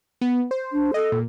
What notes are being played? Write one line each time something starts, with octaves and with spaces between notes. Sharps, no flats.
B3
C5
D4
A4 D#5
A#2